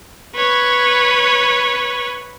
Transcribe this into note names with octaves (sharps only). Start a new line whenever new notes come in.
B4 C#5